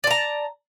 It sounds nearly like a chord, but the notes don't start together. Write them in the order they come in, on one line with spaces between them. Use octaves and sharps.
D5 A5 A#5